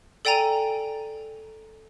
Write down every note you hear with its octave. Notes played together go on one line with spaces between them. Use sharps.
A4 D5 G5 G#5 A#5 D#7